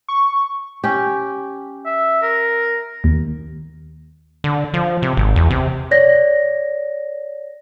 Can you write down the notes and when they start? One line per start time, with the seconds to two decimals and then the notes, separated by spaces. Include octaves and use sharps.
0.08 C#6
0.84 C#4 G4
1.86 E5
2.22 A#4
3.04 D#2
4.44 D3
4.74 F3
5.02 C3
5.17 G#1
5.36 E2
5.50 C3
5.91 C#5 D5 A#6